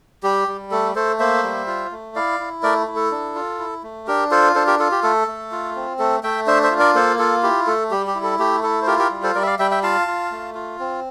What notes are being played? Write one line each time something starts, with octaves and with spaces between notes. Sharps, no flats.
G3 G4
G3
A3 A4
A3 A4 C5
A#3 C5 E5
G3
F4
A3
E4 D5 F5
E4
A3 A#4 D5
E4
A4
D4
F4
E4
A3
D4 G4 A#4
F4 A4 C5
D4 A4 C5
G4 A#4
F4 A4
G4
A3 A4
A3
F4
C4
A3 A4
A3 E5 G5
D4 C5 E5
C5 E5
F4
A#4 D5
A#3 A4 C5
F4 A4
E4 G4
A3 A4
G3 G4
G4
E4
A4
A3 G4
E4 A4
C5
F4 G4 A#4
G4 A#4
G3
A4 C5
G3 A#4 D5
E5
D5 F5
G3 E5 G5
E5 G5
F4 F5 A5
F4
A3
F4
C4